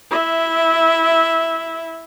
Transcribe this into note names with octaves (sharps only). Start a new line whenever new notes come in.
E4 E5